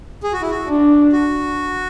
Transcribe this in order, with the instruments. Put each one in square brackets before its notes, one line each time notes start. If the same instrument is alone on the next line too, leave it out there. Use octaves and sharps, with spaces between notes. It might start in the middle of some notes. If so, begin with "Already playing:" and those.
[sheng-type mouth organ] G#4
F#4
E4
F#4
[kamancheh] D4
[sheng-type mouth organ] F#4